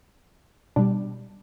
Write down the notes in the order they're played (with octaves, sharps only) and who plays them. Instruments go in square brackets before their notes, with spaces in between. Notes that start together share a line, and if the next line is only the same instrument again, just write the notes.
[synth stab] B2 G3 D4